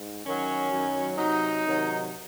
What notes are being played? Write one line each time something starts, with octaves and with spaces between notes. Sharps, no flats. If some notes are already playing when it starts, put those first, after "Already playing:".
Already playing: G#2
F#2 D#3 F#3 C#4
F#2 D#3 F#3
C3 F#3 D#4
C3 D#3 F#3